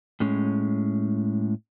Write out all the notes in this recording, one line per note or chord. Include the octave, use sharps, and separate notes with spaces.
A2 G#3 C#4